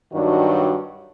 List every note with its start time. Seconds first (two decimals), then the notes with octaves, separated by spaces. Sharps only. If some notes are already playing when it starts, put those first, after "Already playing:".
0.12 G2 D#3 F#3 D4 F#4